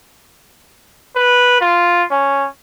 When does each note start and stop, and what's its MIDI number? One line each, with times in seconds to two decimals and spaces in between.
1.16 1.58 71
1.61 2.04 65
2.11 2.48 61